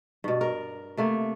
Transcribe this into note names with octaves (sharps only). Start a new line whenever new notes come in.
G2 B2
A#4
C3 A3 A#3